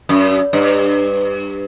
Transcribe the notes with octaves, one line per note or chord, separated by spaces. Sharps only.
F#2
G2